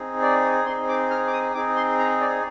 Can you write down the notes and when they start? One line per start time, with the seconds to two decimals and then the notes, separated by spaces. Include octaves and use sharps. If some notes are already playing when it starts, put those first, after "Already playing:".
Already playing: C4 D#4 G#4
0.22 D5
0.65 C4 D#4 G#4 C6
0.89 D6
1.10 F6
1.27 D6
1.33 D#6
1.54 C4 D#4 G#4 D6
1.76 C6
1.99 A#5
2.21 D5